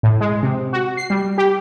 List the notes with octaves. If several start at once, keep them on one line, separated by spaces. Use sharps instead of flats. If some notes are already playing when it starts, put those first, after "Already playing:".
A2
G#3
C3
F#4
C7
G3
G4